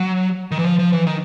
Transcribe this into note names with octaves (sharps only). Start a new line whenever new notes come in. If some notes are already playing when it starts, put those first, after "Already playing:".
Already playing: F#3
D#3
E3
F3
F3
E3
D#3